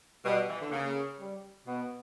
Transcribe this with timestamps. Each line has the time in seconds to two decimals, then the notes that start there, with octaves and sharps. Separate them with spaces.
0.25 B2 G3
0.49 E3
0.60 D3
0.72 C#3 A#3
1.20 G3
1.67 B2 B3